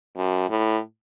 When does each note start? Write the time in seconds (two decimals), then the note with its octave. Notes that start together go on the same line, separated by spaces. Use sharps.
0.17 F#2
0.50 A2